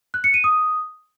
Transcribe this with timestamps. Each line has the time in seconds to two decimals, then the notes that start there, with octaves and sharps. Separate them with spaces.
0.14 F#6
0.24 C#7
0.34 D#7
0.44 D#6